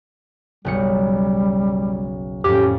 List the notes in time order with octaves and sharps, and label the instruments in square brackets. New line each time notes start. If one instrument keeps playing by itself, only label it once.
[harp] F#1 B1 C#7 [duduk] G3
[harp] F2 A2 [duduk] C#4 [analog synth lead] G4